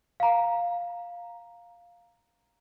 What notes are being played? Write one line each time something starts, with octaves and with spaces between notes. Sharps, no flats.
F5 A#5